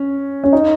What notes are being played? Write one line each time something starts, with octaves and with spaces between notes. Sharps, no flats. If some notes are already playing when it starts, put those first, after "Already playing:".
Already playing: C#4
C#4
D#4